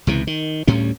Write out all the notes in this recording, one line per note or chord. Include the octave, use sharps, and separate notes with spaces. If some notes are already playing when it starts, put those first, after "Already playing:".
C#2 C3 E3
D#3
D2 A2 G3 C#4